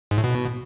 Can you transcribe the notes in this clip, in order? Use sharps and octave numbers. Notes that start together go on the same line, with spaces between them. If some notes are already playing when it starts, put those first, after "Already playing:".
G#2
A2
B2